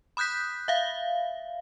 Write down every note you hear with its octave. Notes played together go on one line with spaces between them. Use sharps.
B5 D#6 F#6 G6 B6
E5 F5